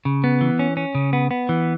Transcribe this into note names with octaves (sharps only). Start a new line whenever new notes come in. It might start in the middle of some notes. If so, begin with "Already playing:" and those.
C#3
B3
E3
C#4
C#4
C#3
B3
B3
E3